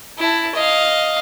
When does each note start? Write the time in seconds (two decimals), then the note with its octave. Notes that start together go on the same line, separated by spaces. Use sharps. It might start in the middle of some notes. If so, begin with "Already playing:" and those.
0.18 E4 A5
0.55 D#5 F5